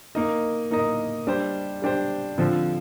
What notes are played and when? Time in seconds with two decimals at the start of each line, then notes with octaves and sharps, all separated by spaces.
0.15 A#3 D#4 A#4 D#5
0.71 A#3 D#4 A#4 D#5
1.27 G3 D4 G4 C5
1.82 G3 D4 G4 C5
2.38 D3 F3 C4 F4